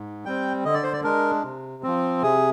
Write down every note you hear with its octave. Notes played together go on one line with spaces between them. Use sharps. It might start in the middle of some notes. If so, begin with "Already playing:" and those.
Already playing: G#2
G3 C4 G5
D3 D#5
D5
C5
D5
G#3 D4 A#4
C3
F3 C4
C3 G#4